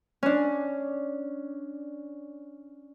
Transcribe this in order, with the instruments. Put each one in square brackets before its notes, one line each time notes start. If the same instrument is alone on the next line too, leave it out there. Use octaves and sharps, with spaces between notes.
[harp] C#4 D4